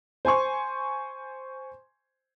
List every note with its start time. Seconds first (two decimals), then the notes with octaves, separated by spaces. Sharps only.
0.25 C5 G#5 C6 C#6